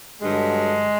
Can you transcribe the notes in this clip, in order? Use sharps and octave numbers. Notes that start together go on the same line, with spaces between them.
G2 D3 F#3 G#3